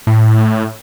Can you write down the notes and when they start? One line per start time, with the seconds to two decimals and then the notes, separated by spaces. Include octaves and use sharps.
0.07 A2